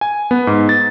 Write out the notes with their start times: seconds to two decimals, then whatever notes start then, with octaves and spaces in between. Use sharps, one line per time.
0.01 G#5
0.31 B3
0.47 G#2
0.69 A6